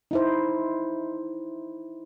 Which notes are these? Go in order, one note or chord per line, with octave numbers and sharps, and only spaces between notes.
D#4 E4 C5